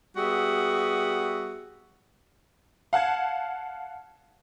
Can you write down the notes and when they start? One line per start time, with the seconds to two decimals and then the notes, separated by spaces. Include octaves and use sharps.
0.17 G3 B3 F#4 G#4 E5
2.93 F5 F#5 A5 G#6